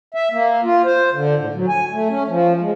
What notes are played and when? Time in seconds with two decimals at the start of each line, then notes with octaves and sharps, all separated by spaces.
0.14 E5
0.31 A#3
0.64 F4
0.84 C5
1.13 D3
1.38 A2
1.54 F#3
1.68 G#5
1.92 A3
2.10 C#4
2.28 F3
2.60 G#3